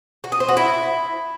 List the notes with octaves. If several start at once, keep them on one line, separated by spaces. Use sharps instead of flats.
F#4
D#5
C5
F#4
E4